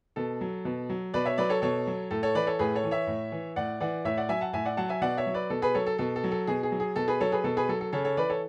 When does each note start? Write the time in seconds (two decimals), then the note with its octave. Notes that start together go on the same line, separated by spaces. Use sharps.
0.16 B2 A4
0.41 F#3
0.65 B2
0.90 F#3
1.14 B2 B4 D5
1.26 C#5 E5
1.38 F#3 B4 D5
1.50 A4 C#5
1.62 B2 A4 C#5
1.87 F#3
2.11 A2 A4
2.23 A4 C#5
2.35 E3 B4 D5
2.47 A4 C#5
2.59 A2 G#4 B4
2.75 A4 C#5
2.84 E3
2.91 C#5 E5
3.07 A2
3.32 E3
3.56 A2 D5 F#5
3.80 E3 D5 F#5
4.05 A2 C#5 E5
4.17 D5 F#5
4.29 F#3 E5 G#5
4.41 F#5 A5
4.53 A2 E5 G#5
4.65 D5 F#5
4.77 F#3 F#5 A5
4.89 E5 G#5
5.02 B2 D5 F#5
5.18 C#5 E5
5.26 F#3
5.34 B4 D5
5.50 B2 A4
5.62 G#4 B4
5.75 F#3 A4 C#5
5.86 A4
5.98 B2 A4
6.16 A4
6.24 F#3
6.31 A4
6.47 B2 G#4
6.63 G#4
6.72 F#3
6.80 G#4
6.96 B2 A4
7.08 G#4 B4
7.21 F#3 A4 C#5
7.32 G#4 B4
7.44 B2 A4
7.57 G#4 B4
7.69 F#3 A4
7.81 A4
7.92 C#3 A4 C#5
8.05 A4 C#5
8.17 E3 B4 D5
8.29 A4 C#5